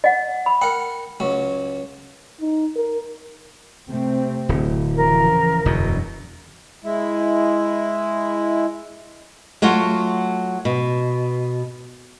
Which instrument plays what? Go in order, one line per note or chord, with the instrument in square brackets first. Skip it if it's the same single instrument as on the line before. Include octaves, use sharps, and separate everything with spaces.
[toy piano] D#5 F#5
B5
[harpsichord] A#4 F#5 [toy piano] G5
[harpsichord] C#2 F#3
[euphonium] D#4
A#4
[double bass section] C3 A3 C4
[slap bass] D1
[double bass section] C#3 E3 F3 [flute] A#4
[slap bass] E1 B2 [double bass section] F#2 D3
[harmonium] G#3 E4
[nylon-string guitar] F#3 A3 F4 F#4
B2